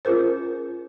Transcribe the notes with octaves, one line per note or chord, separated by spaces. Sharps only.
C#4 F4 G#4 A#4 C5